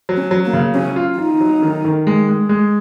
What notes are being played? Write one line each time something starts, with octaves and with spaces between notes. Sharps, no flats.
F#3
C#4
F#3
A#3
C#3
F#3 C#4
F4
D#4 F4
F#3
D#3
D#3
G#3
G#3
G#3